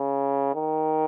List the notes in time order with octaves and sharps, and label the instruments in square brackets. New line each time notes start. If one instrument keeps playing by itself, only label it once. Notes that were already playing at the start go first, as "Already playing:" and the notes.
Already playing: [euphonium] C#3
D#3